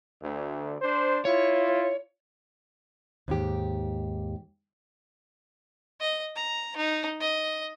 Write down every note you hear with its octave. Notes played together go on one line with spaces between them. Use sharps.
D2
D4 C5
E4 F4 C#5
D#2 G#2 G4
D#5
A#5
D#4
D#5